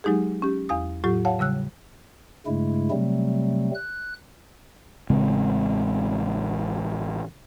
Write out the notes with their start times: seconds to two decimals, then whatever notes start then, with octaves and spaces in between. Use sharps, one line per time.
0.04 F#3 G#3 D#4 G4 G#4
0.42 C#4 G4
0.69 E2 F5 D#6
1.04 A2 F#3 F4 G4
1.25 C#5 F5 F#5 A5
1.39 C#3 G3 E6 F#6
2.47 G2 C#3 G#3 A3 E4
2.91 C3 F#3 G3 A3 C4
3.75 F#6
5.10 A1 C#3 G#3 C4